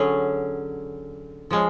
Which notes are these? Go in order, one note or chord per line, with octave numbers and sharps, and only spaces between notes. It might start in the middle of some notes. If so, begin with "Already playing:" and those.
Already playing: D3 F#3 C#4 G#4
F3 G#3 C#4